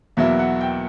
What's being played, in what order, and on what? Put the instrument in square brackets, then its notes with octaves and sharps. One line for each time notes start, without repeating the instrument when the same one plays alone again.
[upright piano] E2 B2 F#3 A#3 E4 E5
F#5
G5